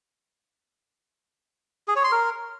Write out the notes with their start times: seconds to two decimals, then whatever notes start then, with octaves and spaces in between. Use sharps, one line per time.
1.88 G#4
1.96 C#5
2.04 C6
2.12 A#4